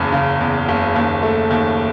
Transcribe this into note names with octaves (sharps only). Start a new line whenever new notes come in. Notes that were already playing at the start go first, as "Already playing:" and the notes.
Already playing: F#1 E2 C#3
C#3
E2
F#1
D#2
A3
D#2